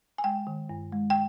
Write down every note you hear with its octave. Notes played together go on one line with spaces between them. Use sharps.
G#5
G#3 G5
D#3
G2
G#3
G5